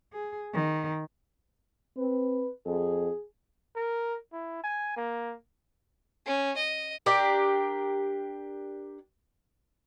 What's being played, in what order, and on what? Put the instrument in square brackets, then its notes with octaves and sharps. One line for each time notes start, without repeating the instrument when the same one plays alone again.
[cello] G#4
D#3
[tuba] C4 [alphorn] B4
[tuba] F2 [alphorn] G#4
[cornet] A#4
E4
G#5
A#3
[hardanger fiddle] C#4
D#5
[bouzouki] D4 G4 A#4